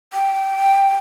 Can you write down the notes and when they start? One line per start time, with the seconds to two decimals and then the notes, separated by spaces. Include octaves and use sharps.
0.13 G5